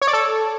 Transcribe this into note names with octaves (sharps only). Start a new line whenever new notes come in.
C#5
D5
A4